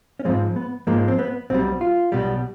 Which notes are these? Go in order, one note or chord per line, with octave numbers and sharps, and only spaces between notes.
C#4
G#2 F3 G#3 C4
B3
G#2 F3 G#3 A#3
C4
B3
B1 B2 G3 C4
F4
B1 B2 G3